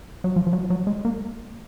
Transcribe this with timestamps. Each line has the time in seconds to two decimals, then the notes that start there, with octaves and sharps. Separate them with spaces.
0.24 F#3
0.36 F3
0.47 F3
0.53 F#3
0.70 F#3
0.87 G#3
1.05 A#3